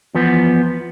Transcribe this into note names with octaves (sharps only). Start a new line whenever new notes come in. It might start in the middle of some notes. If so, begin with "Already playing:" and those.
E2 F3 B3